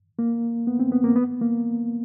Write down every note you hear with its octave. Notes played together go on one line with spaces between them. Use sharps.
A#3
B3
C4
B3
A#3
B3
A#3